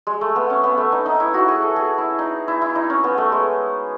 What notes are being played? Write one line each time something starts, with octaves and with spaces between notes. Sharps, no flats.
G#3
A3
B3
C#4
B3
A3
D#4
D#4
E4
F#4
G#4
A4
G#4
E4
D#4
E4
E4
D#4
C#4
B3
A3
G#3